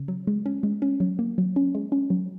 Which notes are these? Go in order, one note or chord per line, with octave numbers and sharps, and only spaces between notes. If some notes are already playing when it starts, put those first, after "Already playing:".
Already playing: C#3
F#3
G#3
C#4
G#3
C#4
F#3
A#3
F#3
C#4
G#3
C#4
F#3